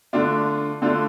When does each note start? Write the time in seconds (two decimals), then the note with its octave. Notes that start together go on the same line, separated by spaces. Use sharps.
0.13 D3 A3 D4 F4
0.82 D3 A3 D4 F4